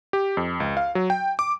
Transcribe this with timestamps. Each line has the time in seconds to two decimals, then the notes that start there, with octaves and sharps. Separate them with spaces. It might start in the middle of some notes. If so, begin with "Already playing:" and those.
0.13 G4
0.37 F2
0.60 C#2
0.77 F5
0.95 F#3
1.10 G5
1.39 D6